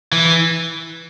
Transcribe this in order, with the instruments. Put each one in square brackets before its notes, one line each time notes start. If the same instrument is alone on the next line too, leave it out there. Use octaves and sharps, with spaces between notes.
[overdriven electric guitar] E3